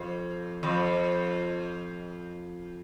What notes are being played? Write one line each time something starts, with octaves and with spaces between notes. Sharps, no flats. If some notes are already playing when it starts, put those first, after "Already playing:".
Already playing: F2
F2